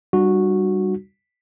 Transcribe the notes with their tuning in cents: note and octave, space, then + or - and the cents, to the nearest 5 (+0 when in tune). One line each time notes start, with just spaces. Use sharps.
G3 +0 D4 +40 F#4 -10